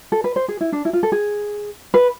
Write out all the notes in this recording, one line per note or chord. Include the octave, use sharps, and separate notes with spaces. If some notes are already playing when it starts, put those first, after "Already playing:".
A4
B4
C5
G#4
E4
D4
E4
F4
A4
G#4
B4